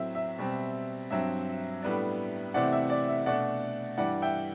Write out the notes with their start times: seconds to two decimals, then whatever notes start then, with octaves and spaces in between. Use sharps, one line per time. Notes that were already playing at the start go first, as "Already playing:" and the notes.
Already playing: A2 F#3 C4 E5
0.15 E5
0.38 B2 G3 C4
1.10 G2 F#3 C4 E5
1.83 A2 G3 B3 D4
2.54 C3 E3 A3 C4 D5 F#5
2.72 E5
2.90 D5
3.08 E5
3.26 B2 A3 D4 D5 F#5
3.98 G2 E3 G3 D5 F#5
4.22 E5 G5